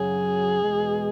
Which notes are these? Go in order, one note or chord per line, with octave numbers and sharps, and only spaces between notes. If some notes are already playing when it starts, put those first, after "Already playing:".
Already playing: F#2 C#3 F#3 G#4
E2 B2 G#3